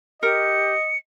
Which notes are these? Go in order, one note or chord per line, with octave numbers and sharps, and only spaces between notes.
G4 A#4 D#5 C#7